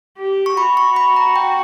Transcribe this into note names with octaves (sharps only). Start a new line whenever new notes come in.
G4
C#6
F#4 B5
C#6
B5
A#5
G5